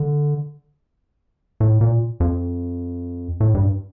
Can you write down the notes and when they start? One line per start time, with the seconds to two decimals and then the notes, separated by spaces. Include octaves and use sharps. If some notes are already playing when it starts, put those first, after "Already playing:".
Already playing: D3
1.60 A2
1.81 A#2
2.20 F2
3.40 A2
3.55 G2